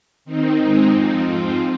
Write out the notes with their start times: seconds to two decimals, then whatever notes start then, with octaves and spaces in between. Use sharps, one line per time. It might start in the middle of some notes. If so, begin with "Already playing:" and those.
0.25 D#3 C4 D#4
0.58 G#2 G#3 C4 D#4
0.91 F2 F3 C4 D#4
1.25 G#2 F3 C4 F4